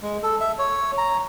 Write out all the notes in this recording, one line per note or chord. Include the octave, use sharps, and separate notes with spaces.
G#3
A4
E5
C#5
A#5